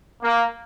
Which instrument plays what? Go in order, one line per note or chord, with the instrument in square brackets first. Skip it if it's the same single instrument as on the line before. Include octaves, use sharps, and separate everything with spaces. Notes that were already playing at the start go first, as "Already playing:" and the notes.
[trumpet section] A#3